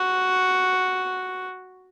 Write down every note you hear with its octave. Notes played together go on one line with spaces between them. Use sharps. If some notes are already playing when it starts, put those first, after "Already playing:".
Already playing: F#4